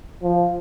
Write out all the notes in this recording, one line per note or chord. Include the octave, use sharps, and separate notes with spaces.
F3